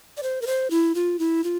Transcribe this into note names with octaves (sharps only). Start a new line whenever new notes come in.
D5
C5
A#4
C5
E4
F4
E4
F4